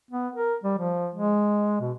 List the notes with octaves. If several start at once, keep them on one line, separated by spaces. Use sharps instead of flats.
B3
A#4
G3
F3
G#3
B2